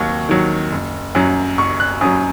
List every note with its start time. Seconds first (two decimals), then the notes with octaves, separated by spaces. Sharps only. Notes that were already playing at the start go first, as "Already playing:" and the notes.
Already playing: D#2 D#3 F#3 C#6
0.29 D#3 F#3
0.72 F#1
1.15 F#2 F#3
1.58 F#1 C#6
1.80 F#6
2.01 F#2 D#6
2.05 F#3